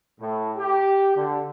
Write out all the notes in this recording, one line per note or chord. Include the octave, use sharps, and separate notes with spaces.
A2
G4
D3